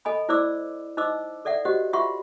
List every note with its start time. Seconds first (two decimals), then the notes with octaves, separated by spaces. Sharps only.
0.05 A4 D#5 G#5 B5
0.29 E4 C5 D5 D6 E6
0.97 D#4 C5 D#5 D6 E6
1.45 A4 D5 E5 F#5
1.65 F#4 G4 C5 D#5 F#5
1.93 F4 E5 F#5 C6 C#6